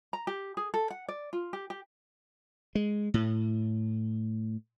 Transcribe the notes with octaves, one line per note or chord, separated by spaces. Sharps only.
A#5
G4
G#4
A4
F#5
D5
F4
G4
G4
G#3
A2